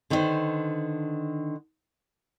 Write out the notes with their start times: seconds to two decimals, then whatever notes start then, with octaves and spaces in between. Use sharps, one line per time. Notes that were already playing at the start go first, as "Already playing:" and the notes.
0.10 D3 D#3 D4 E4 B4 C5